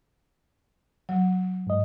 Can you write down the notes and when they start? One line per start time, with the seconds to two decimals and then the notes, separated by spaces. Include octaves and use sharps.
1.09 F#3
1.67 G#2 D#5